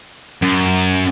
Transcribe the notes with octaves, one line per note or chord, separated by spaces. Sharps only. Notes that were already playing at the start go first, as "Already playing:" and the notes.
F#2